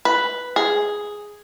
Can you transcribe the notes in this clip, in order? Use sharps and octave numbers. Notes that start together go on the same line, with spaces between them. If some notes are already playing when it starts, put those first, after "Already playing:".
B4
G#4